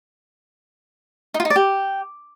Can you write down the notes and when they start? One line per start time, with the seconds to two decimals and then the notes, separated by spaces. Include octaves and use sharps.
1.34 D#4
1.40 F4
1.45 D#4
1.50 D5
1.56 G4